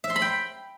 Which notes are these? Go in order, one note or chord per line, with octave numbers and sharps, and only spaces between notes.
E5
C6
B5
G5